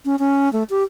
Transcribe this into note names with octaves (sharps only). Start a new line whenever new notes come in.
C#4
C#4
A3
G4